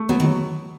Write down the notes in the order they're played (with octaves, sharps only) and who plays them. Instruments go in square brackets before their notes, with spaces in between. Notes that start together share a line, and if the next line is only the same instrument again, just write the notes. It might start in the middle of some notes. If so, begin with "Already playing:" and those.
Already playing: [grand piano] A3
[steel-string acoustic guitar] F#3 [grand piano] B3
[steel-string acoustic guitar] D#3
[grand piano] F#3